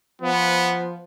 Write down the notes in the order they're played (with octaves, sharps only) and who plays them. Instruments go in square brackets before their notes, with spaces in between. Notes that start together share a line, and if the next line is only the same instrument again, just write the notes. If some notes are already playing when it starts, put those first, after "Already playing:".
[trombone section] F3 [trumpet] B3